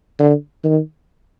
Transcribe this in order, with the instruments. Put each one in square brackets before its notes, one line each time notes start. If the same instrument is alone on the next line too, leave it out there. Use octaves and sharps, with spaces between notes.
[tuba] D3
D#3